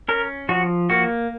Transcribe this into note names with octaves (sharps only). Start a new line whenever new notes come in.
C#4 A#4
F3 F#4
A#3 F#4